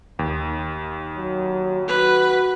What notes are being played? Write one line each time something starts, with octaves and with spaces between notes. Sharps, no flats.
D#2
F#3
F#4 B4